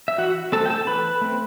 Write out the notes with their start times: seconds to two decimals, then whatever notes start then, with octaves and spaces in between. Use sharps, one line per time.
0.08 E5
0.18 E3 F#4 F#5
0.52 A3 C4 A4 A5
0.66 G5
0.70 A4 A5
0.87 E3 B4 B5
1.21 A3 C4